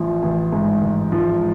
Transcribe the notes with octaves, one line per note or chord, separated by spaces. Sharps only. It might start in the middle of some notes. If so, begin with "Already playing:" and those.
Already playing: A1 F3
A1
G#2
A1
F3